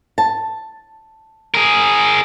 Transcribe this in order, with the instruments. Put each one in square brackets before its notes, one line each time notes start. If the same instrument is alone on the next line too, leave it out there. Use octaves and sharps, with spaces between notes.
[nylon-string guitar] A5
[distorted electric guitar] G#4 A#4